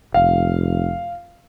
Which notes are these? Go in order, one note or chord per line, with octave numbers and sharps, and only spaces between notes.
F1 F5